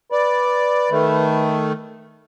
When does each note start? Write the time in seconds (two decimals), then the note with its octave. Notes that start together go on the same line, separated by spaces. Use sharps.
0.12 B4 D5
0.91 D#3 A3